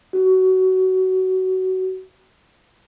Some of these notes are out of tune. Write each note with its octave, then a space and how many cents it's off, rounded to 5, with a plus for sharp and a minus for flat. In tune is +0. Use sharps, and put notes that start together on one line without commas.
F#4 +20